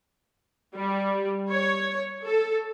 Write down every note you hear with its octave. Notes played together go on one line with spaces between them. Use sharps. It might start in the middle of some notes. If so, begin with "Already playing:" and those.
G3
C#5
A4